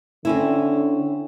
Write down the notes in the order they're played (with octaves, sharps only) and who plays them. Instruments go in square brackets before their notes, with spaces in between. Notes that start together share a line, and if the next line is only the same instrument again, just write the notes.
[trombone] D3 [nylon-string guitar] C4 C#4 E4